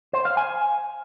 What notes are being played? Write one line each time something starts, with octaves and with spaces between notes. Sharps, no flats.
C5
F5
G#5